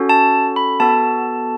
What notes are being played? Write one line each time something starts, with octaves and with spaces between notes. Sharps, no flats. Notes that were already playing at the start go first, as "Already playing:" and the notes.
Already playing: C#4 F#4 A4
A5
B5
B3 F#4 A4 A5